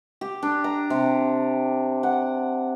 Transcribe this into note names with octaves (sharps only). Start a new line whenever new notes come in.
G4
D4
A#5
C3
F#5